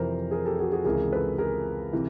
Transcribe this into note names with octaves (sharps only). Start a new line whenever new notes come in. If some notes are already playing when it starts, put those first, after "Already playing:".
Already playing: F2 C3 E3 A#4 C5
G#4 A#4
G4 A4
F#4 G#4
F#4 G#4
C#2 C3 E3 G#4 A#4
A4 B4
G#4 A#4
C3 E3